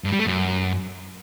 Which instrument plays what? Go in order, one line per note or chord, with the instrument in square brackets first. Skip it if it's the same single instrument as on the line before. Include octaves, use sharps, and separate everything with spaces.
[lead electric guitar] G2
G3
A3
F#2